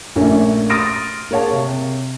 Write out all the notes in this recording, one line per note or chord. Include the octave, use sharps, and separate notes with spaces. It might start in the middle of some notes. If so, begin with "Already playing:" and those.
A#1 A3 A#3 C#4 G#5
C6 D#6 F6 A6 A#6 D7
A#3 G#4 C#5 F5 A5
C3